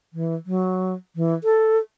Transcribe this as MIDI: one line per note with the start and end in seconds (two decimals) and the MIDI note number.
0.13 0.35 52
0.46 0.94 54
1.16 1.34 52
1.44 1.78 69